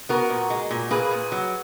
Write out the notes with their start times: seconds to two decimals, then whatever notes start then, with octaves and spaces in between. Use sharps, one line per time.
0.09 B3 F#4 A#4
0.30 A#2
0.50 G#3
0.71 A#2
0.91 A#3 G#4 B4
1.11 A#2
1.32 F#3